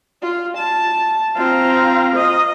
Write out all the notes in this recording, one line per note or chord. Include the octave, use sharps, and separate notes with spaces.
F4
A5
C4 F4 F5 A#5
D#5